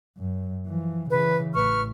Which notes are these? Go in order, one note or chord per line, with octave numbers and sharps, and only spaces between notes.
F#2
E3 F3
C#3 E3 B4
A1 B4 C#6 F6